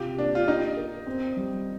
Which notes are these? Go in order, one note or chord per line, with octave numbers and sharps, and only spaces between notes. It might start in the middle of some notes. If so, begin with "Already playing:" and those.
Already playing: C3 F4 G4
A#3 D4
F4
D#4 G4
A#4
C4
G3